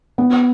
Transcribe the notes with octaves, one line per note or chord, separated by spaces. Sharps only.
B3